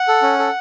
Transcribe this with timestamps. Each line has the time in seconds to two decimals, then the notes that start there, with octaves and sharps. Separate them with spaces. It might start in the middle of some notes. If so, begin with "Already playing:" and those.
Already playing: F#5
0.08 A4
0.22 C#4
0.39 A4